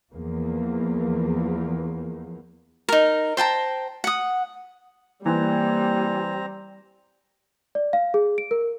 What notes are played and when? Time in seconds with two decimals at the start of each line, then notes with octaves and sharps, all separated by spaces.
0.12 E2 F3 A#3
2.89 D#4 A#4
3.37 C5 G5 A5 A#5
4.04 F#5 D#6
5.26 E3 G3 A#3 C4 A#5
7.75 D5
7.93 F5
8.14 G#4
8.38 D7
8.51 A#4